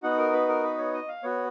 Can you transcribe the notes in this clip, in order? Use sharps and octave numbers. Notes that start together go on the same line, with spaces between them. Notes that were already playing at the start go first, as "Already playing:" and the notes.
B3 D#4 F#4 F#5
A#4
B4
A#4
B4
C#5
D#5
F5
B3 F#4 C#5